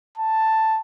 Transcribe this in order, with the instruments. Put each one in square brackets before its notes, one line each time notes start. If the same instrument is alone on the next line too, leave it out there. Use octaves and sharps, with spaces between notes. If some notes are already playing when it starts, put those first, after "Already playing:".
[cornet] A5